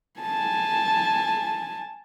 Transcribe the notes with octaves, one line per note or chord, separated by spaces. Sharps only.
G#5 A5